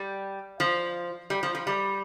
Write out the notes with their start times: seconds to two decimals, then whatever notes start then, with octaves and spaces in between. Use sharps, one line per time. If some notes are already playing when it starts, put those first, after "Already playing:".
Already playing: G3
0.60 F3
1.30 G3
1.43 F3
1.55 F3
1.67 G3